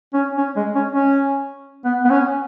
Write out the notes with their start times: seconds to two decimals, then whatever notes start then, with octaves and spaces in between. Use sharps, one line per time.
0.14 C#4
0.37 C#4
0.56 G#3
0.75 C#4
0.93 C#4
1.85 B3
2.05 B3
2.10 C#4